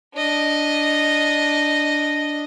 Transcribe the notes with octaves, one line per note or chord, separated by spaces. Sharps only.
D4 D#5